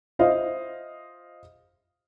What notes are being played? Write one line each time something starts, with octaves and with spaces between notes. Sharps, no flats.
E4 F4 C5 D#5 F5